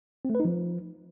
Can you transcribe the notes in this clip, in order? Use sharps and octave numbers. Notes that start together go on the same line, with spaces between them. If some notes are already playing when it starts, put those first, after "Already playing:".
C4
A3
B4
D#4
F3